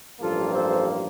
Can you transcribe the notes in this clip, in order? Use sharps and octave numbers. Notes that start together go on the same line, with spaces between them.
A1 G2 F3 A#3 F4 A4
A4 C5